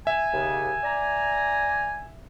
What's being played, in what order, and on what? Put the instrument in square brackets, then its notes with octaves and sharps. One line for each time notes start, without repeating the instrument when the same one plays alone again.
[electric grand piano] E5 [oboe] G#5
[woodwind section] D#2 C#3
D5 A#5